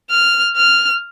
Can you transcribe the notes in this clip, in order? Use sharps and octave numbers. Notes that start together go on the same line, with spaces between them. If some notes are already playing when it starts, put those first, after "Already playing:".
F6
F6